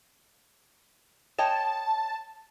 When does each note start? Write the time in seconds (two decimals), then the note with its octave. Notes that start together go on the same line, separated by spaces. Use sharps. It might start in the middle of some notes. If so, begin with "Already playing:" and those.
1.38 C#5 D#5 G5 A5